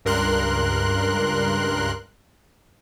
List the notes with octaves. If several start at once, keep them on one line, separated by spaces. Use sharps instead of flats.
C#2 G2 A#4 C6 F#6